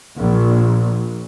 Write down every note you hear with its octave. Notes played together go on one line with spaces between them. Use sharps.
A#1